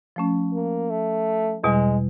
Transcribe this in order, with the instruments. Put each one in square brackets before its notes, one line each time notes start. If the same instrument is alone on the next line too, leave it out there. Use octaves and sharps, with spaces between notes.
[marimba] F3 A3 C#4
[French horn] A#3
A3
[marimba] E2 B2 G3 [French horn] G#3